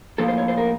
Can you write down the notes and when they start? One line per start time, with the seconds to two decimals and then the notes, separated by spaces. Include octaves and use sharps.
0.18 A2 F3 A#3 A4
0.28 C5
0.38 C#5
0.48 C5
0.58 A#4